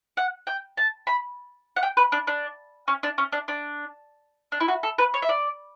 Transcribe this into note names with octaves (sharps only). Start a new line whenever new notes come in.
F#5
G5
A5
B5
F#5
G5
B4
D4
D4
C#4
D4
C#4
D4
D4
D4
E4
F#4
A4
B4
C#5
E5
D5